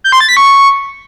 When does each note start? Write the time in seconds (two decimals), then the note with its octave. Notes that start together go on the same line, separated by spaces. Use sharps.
0.04 G6
0.12 C6
0.20 A6
0.29 B6
0.37 C#6